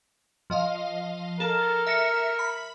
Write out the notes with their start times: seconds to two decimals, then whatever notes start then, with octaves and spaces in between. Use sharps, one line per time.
0.50 F3 D#5 F5
1.40 A4 A#4
1.87 E5 A#6 C#7
2.39 B5